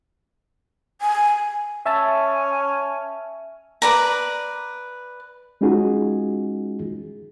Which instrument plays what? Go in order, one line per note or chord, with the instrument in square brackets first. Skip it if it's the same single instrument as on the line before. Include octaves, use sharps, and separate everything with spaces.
[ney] G#5
[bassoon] C#4 [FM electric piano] E5 A5
[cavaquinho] B4 D5 A#5
[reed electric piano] G#3 C#4 D#4 F4 F#4 G#4